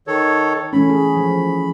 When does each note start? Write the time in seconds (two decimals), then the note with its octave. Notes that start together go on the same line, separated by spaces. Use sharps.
0.07 D#3 A4 C#5
0.73 E3 A3 C#4 B5
0.90 G#4
1.17 F3